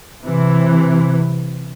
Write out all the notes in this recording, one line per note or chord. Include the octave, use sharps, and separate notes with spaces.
C3 E3